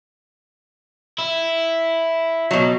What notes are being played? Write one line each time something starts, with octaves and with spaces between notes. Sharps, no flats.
E4
B2 F#3